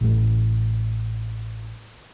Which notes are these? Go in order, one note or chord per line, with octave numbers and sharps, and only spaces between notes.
A1 A2